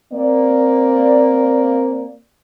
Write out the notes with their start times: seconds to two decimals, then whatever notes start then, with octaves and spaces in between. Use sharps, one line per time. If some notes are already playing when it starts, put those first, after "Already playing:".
0.14 A#3 C4 D5